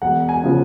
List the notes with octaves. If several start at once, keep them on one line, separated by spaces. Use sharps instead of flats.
E1 F#5
G#5
C#3 F3